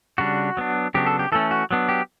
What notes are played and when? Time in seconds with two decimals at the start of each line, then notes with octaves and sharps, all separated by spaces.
0.18 C#3 G3 D4 F#4
0.57 F#3 B3 D4
0.94 C#3 F#3 B3 D4 G4
1.06 A4
1.19 G4
1.32 E3 A3 C#4 A4
1.51 F#4
1.71 F#3 B3 D4
1.89 G4